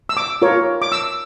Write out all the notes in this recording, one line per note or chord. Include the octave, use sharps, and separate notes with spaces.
E6
D6
F4 A#4 C#5
D6
E6